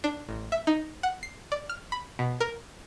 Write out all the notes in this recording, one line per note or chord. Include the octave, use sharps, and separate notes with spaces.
D4
A1
E5
D#4
F#5
C7
D5
F6
B5
B2
A#4